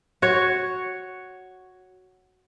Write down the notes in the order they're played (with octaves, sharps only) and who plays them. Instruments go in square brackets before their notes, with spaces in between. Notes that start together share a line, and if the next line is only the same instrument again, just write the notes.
[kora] F#4 C#5